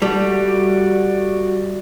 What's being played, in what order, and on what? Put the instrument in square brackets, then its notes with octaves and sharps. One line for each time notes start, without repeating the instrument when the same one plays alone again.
[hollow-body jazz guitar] G3 A3 [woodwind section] F#4 D5